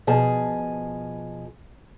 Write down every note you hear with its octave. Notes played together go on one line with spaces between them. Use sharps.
B2 F3 G#4 A5